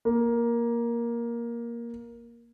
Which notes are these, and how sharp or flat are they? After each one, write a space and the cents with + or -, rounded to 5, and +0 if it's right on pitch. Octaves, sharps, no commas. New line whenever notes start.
A#3 +10